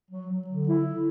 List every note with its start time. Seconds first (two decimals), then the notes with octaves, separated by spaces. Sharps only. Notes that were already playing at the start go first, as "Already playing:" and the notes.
0.11 F#3
0.30 F#3
0.48 D3
0.67 E4
0.86 D3